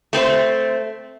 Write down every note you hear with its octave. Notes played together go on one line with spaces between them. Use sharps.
A3 C4 B4 C5